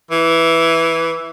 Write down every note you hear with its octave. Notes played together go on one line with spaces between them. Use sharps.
E3